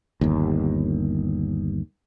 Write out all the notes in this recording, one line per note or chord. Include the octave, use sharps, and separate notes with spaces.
G1 D#2